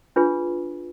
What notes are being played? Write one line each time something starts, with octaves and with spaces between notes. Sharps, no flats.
D4 F4 G#4 B4